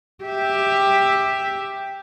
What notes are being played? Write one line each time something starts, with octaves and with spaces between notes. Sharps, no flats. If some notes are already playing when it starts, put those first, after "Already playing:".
G4 E5